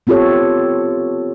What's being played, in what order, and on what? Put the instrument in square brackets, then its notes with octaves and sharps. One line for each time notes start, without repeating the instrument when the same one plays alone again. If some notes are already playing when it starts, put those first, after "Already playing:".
[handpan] B3 C4 F4 G4 A4 C#5